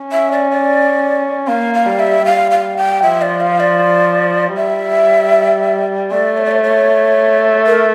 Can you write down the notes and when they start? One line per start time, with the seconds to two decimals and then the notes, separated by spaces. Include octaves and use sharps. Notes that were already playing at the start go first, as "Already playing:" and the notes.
Already playing: C#4
0.12 E5
0.32 D5
0.51 D5
1.48 A#3 F5
1.74 F5
1.86 G3
1.99 E5
2.25 G3 F5
2.51 F5
2.77 G5
3.03 F3 E5
3.22 D5
3.41 F5
3.60 D5
4.57 G3 E5
6.11 A3 D5
6.37 C#5
6.45 D5
6.51 C#5
6.64 C#5
7.67 A#4